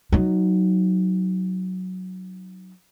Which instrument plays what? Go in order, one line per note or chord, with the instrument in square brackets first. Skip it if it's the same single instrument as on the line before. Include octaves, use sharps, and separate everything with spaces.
[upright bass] F#3 D#4